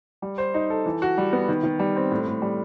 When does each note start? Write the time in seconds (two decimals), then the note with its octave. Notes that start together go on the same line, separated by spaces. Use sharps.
0.22 G3
0.38 C5
0.54 D#4
0.70 A4
0.86 E3
1.02 F#4
1.18 G3
1.33 B3
1.49 D#3
1.63 D#3
1.79 G3
1.96 C4
2.11 A2
2.27 A2
2.42 G3